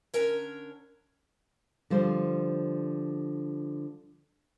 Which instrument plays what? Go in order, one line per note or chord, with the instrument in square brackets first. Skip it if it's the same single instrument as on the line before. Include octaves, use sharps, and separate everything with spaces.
[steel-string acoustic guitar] D3 C#4 A#4 C#5
[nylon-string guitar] D3 F3 G3 C5